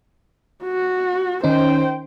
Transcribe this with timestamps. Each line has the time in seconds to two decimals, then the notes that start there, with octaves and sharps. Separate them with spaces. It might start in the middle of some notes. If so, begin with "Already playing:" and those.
0.63 F#4
1.44 D#3 C#4 D#4 C5 G5